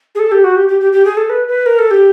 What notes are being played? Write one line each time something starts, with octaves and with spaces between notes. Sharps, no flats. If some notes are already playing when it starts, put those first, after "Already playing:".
G#4
A4
G4
F#4
G4
G4
G4
G4
G#4
A4
B4
B4
A#4
A4
G4